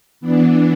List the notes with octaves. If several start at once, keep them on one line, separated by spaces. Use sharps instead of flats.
E3 B3 D4